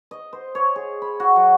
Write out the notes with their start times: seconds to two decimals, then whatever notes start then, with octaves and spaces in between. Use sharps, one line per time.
0.11 D#5
0.33 C5
0.55 C#5
0.76 G#4
1.02 B5
1.20 F#4
1.36 F#3